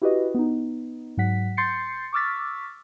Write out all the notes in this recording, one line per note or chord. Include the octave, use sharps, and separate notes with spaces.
E4 F#4 G4 B4 D#5
B3 D#4
G#2 F#3 F#5 B6
C6 G6 A6 C7 C#7
C#6 D6 E6 F6 A6 B6